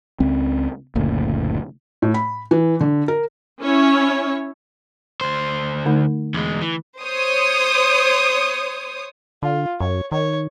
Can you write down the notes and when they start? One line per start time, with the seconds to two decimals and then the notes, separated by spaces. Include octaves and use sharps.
0.20 C#2 C4
0.95 F#1 D2 A#2
2.02 A2
2.14 B5
2.51 E3
2.81 D3
3.08 A#4
3.61 C#4 E4 C#5
5.21 D2 C5
5.85 D3 A3 D#4
6.34 E2 G#3
6.62 E3
7.01 C5 C#5 D#6
9.42 D3 F4
9.80 F#2 C#5
10.12 D#3 C#5